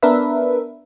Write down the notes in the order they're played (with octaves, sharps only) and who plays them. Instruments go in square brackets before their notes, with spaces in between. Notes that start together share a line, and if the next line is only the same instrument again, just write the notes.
[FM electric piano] B3 D4 A#4 B4 E5